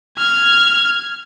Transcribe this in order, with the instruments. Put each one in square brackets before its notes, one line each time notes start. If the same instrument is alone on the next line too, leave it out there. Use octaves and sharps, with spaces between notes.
[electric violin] F6 G#6